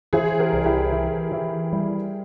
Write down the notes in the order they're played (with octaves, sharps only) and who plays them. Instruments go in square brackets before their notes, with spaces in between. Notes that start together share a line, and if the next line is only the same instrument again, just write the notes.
[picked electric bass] E3 [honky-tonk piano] G#4 C5
[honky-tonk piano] G4 A#4
[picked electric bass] C2
[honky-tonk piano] E4 G4
[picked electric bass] E3
E3
G3